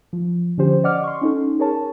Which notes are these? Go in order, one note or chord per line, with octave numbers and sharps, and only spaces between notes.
F3
D3 F3 C#4 G4 C5
D5 D#5 F#5 D6 F6
C6 C#6
C#4 D#4 A4
G#4 A#4 C#5 A5